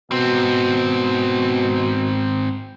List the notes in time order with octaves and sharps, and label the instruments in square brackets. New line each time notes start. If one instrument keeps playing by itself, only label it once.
[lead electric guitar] G#2 C4 [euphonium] B2